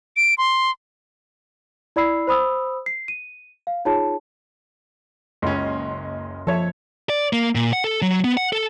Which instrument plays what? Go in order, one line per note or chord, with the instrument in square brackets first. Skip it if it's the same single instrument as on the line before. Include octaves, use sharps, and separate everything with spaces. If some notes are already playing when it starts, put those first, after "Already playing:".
[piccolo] D7
C6
[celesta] E4 D5 B5 E6 C7
C5 B5 D#6 E6
C7
D#7
F5
D#4 F4 G#4 C#5 A5
[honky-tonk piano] F#1 D#5 C6 [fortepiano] C#2 C#4
[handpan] F3 [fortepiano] A4 C#5 E5
[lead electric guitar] D5
A#3
A#2
F#5
A4
F#3
B3
F#5
A4